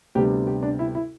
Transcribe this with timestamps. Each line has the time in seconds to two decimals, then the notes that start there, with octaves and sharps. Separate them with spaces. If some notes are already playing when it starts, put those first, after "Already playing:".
0.15 D2 C3 G3 B3 D4 G4
0.47 G4
0.63 D4
0.79 E4
0.95 E4